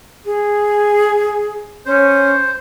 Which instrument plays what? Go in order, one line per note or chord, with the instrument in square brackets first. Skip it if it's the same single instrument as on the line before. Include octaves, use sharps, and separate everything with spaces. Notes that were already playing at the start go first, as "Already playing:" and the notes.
[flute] G#4
[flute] C#4 [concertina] C5